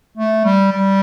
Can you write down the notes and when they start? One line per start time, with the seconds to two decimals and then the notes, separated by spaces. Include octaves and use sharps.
0.17 A3
0.45 G3
0.72 G3